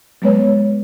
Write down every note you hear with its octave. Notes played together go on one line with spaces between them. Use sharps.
F#3 G#3 B3 B4 C#5